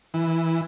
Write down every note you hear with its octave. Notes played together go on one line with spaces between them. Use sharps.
E3